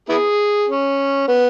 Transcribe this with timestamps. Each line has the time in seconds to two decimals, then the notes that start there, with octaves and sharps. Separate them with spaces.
0.09 B3 E4 G#4
0.68 C#4
1.28 B3